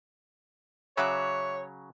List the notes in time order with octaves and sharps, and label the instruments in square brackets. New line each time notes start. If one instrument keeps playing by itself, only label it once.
[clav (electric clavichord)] C#3 F#3 [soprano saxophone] C#5 [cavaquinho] E5 F#5 D6